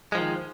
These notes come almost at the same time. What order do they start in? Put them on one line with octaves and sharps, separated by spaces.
G#3 F3 D#3